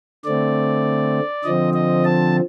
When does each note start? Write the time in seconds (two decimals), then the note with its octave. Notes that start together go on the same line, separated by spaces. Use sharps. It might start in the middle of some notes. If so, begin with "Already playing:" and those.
0.24 D3 A3 C4 D5
1.44 D3 F3 C4 D#5
1.73 D#5
2.04 A5